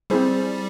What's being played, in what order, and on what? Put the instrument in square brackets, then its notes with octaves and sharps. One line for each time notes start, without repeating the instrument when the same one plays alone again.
[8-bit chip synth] G3 [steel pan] C4 E4 G#4 C5